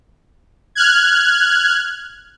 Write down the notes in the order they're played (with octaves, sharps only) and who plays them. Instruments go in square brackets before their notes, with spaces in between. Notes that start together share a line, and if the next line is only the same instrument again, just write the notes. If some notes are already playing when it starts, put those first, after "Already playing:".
[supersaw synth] F6 F#6 G#6